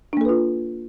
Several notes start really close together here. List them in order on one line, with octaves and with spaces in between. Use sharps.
D4 A#3 A4 B4 F4